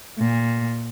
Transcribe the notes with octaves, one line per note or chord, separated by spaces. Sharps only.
A#2